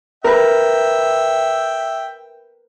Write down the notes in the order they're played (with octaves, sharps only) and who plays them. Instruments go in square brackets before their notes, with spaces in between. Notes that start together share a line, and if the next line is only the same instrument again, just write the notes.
[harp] A#4 B4 [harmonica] E5 G5